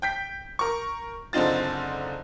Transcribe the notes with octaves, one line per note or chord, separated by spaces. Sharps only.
G5 G6 B6
A#4 C#6
F#1 D3 C4 D#4 F4 A6